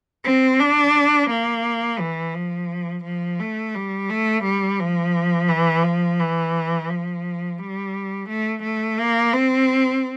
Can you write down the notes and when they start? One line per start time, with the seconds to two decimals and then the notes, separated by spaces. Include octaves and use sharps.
0.25 C4
0.60 D4
1.30 A#3
2.00 E3
2.35 F3
3.04 F3
3.40 A3
3.75 G3
4.10 A3
4.44 G3
4.80 F3
5.49 E3
5.84 F3
6.20 E3
6.90 F3
7.58 G3
8.29 A3
8.63 A3
8.99 A#3
9.33 C4